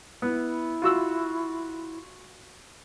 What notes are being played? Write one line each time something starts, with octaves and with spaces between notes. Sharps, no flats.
B3 E4
F4 F#4 E6